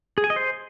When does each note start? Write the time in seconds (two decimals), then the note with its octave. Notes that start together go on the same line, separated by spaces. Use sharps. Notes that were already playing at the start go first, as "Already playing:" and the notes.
0.18 G#4
0.24 G#5
0.30 D#5
0.36 C5